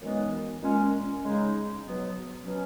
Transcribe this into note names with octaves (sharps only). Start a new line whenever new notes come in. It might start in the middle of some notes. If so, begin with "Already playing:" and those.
F#2 E3 G#3 B3 D#4
A#2 G#3 C#4
C#3 G#3 D#4
B2 F#3 B3
B2 F#3 C#4